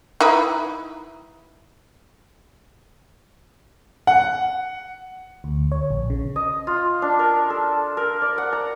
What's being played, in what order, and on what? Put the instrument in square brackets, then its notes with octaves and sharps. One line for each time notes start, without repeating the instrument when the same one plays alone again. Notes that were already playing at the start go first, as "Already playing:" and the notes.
[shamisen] D#4 E4 B4
[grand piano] F#5
[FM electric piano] D2
C#5
A#1
C#3
[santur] D#5
F4
D4
A#4
A4
A#4
D5
F#5
A#5